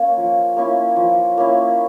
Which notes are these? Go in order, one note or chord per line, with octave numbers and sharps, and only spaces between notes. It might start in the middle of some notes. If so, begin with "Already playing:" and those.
Already playing: A#3 C#4
F3
A#3 C#4 E4
F3
A#3 C#4 E4